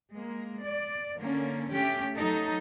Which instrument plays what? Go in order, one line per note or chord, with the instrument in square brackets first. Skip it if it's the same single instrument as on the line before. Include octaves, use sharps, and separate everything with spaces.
[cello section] G#3 A#3
D5
D3 A#3 C#4
A3 C#4 G4
F#3 D#4 A4 D#5